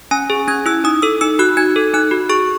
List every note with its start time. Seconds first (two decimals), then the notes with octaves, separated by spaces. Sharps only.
0.11 C#4 G#5
0.30 G#4
0.48 C#4 G#6
0.66 E4 E6
0.84 D#4 D#6
1.02 A4 E6
1.21 D#4 E6
1.39 F#4 F#6
1.57 D#4 G#6
1.76 A4
1.94 D#4 F#6
2.11 F#4
2.29 G#4 C#6